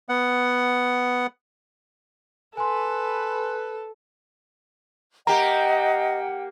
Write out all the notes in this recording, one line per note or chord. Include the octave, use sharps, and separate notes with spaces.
B3 F#5
A4 B4 G#5 C6
A#3 G4 D#5 F#5 G5 A#5